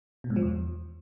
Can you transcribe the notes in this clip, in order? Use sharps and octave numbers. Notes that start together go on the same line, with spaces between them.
B2
G#2
F3
E2